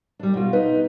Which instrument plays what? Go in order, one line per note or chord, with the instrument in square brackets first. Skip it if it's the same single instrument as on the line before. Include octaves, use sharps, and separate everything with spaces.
[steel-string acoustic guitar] G3 D4
B2 F4
[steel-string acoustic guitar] D#4 [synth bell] B4